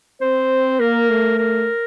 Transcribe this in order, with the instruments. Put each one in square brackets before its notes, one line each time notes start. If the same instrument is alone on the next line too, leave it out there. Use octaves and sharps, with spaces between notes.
[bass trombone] C4 [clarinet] C5
[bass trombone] A#3 [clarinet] A#4
[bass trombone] A3
[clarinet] A#4